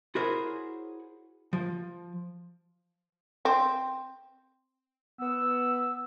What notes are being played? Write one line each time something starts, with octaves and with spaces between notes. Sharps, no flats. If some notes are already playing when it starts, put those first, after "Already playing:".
E4 F#4 G#4 A#4 C5 C#5
F3
C4
B3 E6